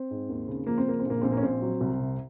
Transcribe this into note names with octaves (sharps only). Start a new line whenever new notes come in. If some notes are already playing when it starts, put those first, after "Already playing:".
Already playing: C4
G#2
D#2
C#3
F3 A#3
C4
C#3 A#3
C4
A#1 A#3
A#1 C4
A#3
C#4
A#1 C4
F#3
C2
C3